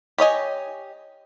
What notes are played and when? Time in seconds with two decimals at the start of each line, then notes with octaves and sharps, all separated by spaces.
0.18 G4 C#5 D#5 G#5